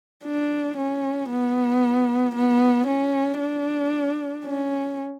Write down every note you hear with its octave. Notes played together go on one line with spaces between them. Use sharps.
D4
C#4
B3
B3
C#4
D4
C#4